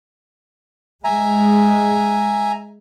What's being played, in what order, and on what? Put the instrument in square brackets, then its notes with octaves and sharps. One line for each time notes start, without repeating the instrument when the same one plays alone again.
[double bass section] G#3 [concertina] E5 G#5 A#5